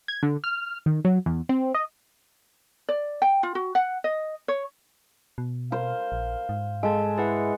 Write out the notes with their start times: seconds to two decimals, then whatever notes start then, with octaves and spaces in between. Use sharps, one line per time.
0.08 G#6
0.23 D3
0.44 F6
0.86 D#3
1.05 F#3
1.26 E2
1.49 C4
1.74 D#5
2.89 D5
3.22 G5
3.43 F4
3.55 F#4
3.75 F#5
4.04 D#5
4.48 C#5
5.38 B2
5.72 A#4 C5 F5
6.12 A#1
6.49 G#2
6.83 G#3 A4 A5
7.18 E4 G#4 B4 F#5